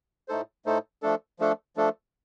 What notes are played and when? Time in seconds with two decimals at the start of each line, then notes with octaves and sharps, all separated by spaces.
0.28 A2 A3 D#4 A4 C5
0.66 A2 A3 D#4 A4 C5
1.02 F3 A3 D4 A4
1.39 F3 A3 D4 A4
1.76 F3 A3 D4 A4